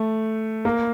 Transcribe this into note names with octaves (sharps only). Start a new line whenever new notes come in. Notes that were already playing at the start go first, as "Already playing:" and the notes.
Already playing: A3
A#3